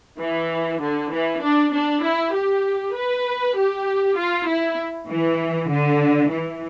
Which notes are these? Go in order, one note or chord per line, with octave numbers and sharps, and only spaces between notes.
E3
D3
E3
D4
D4
E4
G4
B4
G4
F4
E4
E3
D3
E3